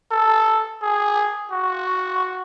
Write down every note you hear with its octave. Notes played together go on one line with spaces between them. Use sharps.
A4
G#4
F#4